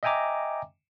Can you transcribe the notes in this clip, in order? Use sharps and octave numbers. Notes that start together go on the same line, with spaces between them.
D#5 E5 G5 G#5 A#5 D6